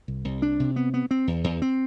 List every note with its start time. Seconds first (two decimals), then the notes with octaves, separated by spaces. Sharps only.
0.08 C2
0.25 C2
0.42 D4
0.60 C3
0.76 B3
0.94 B3
1.11 C4
1.27 E2
1.44 E2
1.62 C4